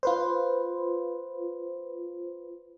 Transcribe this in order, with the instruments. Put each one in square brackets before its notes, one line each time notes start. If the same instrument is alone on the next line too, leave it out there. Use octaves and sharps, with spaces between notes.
[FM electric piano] F4 B4 C5